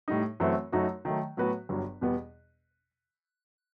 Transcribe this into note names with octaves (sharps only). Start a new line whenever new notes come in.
A2 G3 D#4
F#2 E3 A3 C4 F#4
F#2 F#3 A3 D#4 F#4
D#3 F#3 A3
A2 F#3 B3 F#4 B4
G1 G2 F#3
E2 B2 G3 B3